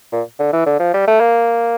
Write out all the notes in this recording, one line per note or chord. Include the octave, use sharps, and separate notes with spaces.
A#2
D3
E3
D3
F3
G3
A3
A#3